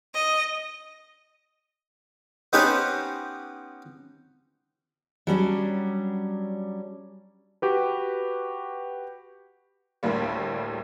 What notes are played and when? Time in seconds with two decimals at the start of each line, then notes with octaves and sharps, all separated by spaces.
0.14 D#5
2.53 B3 C#4 D#4 G4 B4 C5
5.27 F#3 G3 C#4 D4
7.62 F#4 G4 B4
10.03 D2 A2 G3 A#3